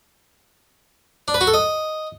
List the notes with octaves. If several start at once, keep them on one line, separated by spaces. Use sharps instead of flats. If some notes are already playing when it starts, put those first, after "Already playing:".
D4
B4
F#4
A4
D#5